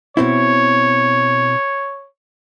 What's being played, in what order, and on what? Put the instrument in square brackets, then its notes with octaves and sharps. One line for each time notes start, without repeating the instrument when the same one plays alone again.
[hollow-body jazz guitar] B2 C4 E4 [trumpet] C#5